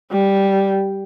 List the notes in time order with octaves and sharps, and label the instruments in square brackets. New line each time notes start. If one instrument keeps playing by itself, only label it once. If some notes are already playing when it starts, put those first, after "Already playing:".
[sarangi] G3